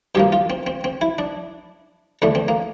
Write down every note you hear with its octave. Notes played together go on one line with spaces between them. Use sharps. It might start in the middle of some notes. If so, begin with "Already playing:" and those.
G2 F3 A#3 G4
F4
C4
C4
C4
E4
D4
E2 D3 A3 D4
C4
A#3